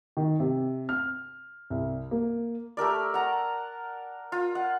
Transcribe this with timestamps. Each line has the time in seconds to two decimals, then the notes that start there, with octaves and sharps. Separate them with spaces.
0.17 D#3
0.40 C3
0.89 F6
1.70 C2
2.11 A#3
2.77 A3 G4 A#4 D5
3.14 F#5 A#5
4.32 F4
4.55 F#5